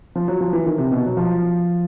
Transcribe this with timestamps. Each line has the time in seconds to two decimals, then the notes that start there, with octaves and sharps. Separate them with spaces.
0.15 F3
0.28 F#3
0.41 F3
0.53 E3
0.66 D#3
0.78 C3
0.92 B2
1.06 F#3
1.17 F3